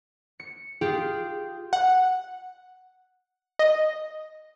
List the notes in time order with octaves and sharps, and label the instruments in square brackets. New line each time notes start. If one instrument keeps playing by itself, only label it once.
[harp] C#7
[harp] F4 G4 [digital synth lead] G#4
[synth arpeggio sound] F#5
D#5